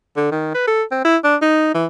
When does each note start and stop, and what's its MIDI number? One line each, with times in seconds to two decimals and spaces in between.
0.17 0.30 50
0.31 0.52 51
0.54 0.65 71
0.67 0.83 69
0.91 1.03 60
1.05 1.17 64
1.24 1.36 62
1.42 1.72 63
1.74 1.86 52